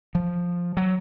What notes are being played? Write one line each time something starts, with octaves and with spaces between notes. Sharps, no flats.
F3
F#3